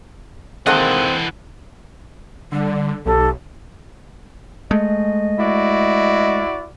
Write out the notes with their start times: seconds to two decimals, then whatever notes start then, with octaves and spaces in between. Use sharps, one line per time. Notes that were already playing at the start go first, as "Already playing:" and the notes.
0.66 D#3 E3 G#3 A#3 C4 A4 D#5 F#5
2.52 D3 G3
3.06 B1 G4 A4
4.71 G#3 A3 D#5
5.39 E4 F#4 D5